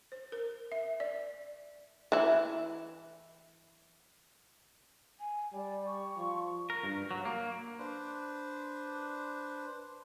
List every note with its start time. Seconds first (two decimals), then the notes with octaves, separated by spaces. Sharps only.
0.12 C5
0.32 A#4
0.72 E5
1.00 D5
2.12 E3 E4
5.20 G#5
5.53 G3 D5
5.86 C#6
6.17 F3
6.70 A#4
6.83 G2
7.11 F#3
7.25 A#3
7.79 D4 B4 C5